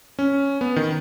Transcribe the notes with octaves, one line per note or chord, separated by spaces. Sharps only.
C#4
B3
D#3